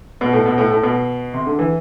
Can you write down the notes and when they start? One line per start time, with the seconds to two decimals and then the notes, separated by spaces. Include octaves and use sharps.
0.21 B2
0.33 A2
0.46 B2
0.58 A2
0.71 A2
0.83 B2
1.34 C3
1.46 D3
1.59 E3